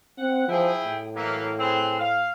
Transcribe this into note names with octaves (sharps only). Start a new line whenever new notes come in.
C4 F#5
F3 E4 G#4 G5
A2
E3 F#3 A#3
C4 G#4 B4
F5